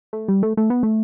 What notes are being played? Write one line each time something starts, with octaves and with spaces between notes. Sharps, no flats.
A3
G3
A3
A3
B3
A3